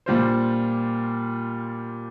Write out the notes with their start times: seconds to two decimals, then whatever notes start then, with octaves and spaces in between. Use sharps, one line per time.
0.06 A#2 G3 D4 F4 C5